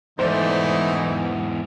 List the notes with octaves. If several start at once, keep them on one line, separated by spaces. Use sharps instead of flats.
E2 G#2 E3 A3 D#4 E4 C5 D5